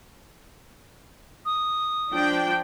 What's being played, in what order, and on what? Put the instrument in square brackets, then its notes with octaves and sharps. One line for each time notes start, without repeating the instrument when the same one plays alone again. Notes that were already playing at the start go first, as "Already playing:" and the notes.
[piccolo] D#6
[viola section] F3 D4 G5